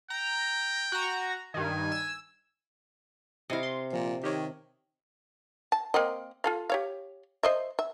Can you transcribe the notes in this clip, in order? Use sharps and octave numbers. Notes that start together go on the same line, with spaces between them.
G5 A#5
F#4 A#5
G2 D#3 G#5
E6
C3 E4 D#5 F5
C6
A#2 F3
D#3 G4 C#5
A5
A#3 C4 D#5
F4 A4 F5
G4 C#5 F5
C5 D#5 E5
E5